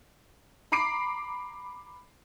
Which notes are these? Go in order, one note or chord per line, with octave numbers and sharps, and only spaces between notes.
A#5 B5 D6 C7 D7